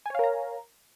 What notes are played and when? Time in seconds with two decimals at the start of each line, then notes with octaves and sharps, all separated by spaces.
0.06 G#5
0.10 C#5
0.15 F5
0.19 A#4
0.24 A#5